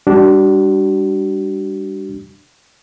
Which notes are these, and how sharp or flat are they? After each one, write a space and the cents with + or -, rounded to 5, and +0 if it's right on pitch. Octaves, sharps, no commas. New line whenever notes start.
G3 +30 D4 +0 F#4 +40